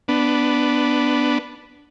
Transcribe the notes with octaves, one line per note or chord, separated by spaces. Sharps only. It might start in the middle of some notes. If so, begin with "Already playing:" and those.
B3 D4